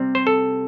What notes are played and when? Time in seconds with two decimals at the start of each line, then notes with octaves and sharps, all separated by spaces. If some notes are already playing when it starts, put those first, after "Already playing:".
Already playing: C3 G3 C4
0.15 C5
0.27 A4